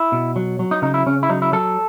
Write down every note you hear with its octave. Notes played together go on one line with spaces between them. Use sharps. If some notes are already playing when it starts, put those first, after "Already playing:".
Already playing: E4
B2
F#3
F#3
D#4
C#3 D#4
E4
C#3 C#4
E4
F#3 D#4
E4
F#3 A4